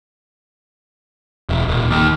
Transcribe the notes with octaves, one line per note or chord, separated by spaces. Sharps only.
E1
D#1
D#2